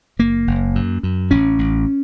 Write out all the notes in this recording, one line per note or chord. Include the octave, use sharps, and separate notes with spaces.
F#1 A#3
F#1
F#2
F#2
A1 C#4
A1